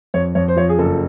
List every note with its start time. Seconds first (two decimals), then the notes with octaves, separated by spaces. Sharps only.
0.14 F2 C#5
0.35 F2 C#5
0.48 C5
0.56 F3 C#5
0.69 G#4
0.78 F#1 A4